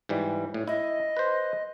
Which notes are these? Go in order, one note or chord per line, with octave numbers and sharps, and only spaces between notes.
G#2 E3 G3
A2
E4 D#5
B4 C5